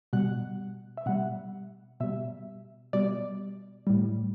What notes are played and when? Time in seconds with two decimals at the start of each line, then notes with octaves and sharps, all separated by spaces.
0.13 B2 G3 F#5
0.97 E5
1.06 B2 G3 F#5
2.00 B2 G3 E5
2.93 B2 G3 D5
3.87 A2 G3